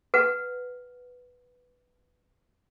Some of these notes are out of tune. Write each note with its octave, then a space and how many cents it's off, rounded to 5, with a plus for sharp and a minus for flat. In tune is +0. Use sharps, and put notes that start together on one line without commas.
B4 +0 F#5 -15